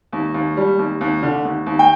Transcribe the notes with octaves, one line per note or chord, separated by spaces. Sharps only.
D#2
D#2
G3
D#2
D#2
D3
D#2
D#2
G5